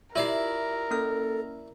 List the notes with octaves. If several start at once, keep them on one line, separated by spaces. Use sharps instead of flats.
E4 F4 G4 A#4 D5 E5
A#3 C#4 A4 F6